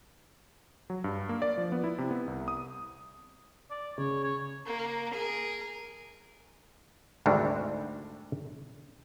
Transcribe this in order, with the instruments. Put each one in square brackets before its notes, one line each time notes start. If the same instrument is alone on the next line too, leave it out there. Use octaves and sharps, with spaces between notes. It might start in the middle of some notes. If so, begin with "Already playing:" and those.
[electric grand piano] F#3
G2
A#3
D5
F3
B3
E4
C3
B3
C2
D#6
[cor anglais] D5
[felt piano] C#3 [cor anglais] C#5
[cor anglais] C#5
[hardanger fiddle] A#3
G#4 A#4
[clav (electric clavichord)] G#1 D2 C3 G3 D4 F#4